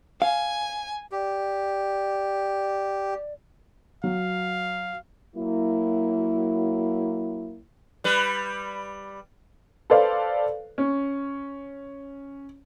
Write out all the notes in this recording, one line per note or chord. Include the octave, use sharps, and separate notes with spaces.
F5 G#5
G4 D5
F#3 F5
F#3 A#3 E4
G3 B4
A4 B4 C5 D5 F5
C#4